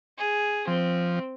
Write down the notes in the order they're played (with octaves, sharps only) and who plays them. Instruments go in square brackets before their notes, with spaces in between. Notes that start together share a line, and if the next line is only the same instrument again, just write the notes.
[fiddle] G#4
[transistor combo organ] F3 [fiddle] C4